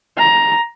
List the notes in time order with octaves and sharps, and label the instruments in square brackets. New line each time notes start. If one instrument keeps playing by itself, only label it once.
[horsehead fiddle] A#5